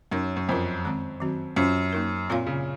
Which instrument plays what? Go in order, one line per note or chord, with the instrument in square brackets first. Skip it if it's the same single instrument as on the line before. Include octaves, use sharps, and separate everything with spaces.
[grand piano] F#2 [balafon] D#4 A#4 C#5
[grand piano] F#2
[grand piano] F2 [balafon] F#3 C#4 F4 A#4
[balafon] D#3 G#3 C4
D#3 F#3 C4 F#4
[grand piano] F#2 [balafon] C#4 F4 C5 F5
[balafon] A#3 D#4 A#4
[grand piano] A#2 [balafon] C4 F4 A#4 C#5 F5
[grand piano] C#3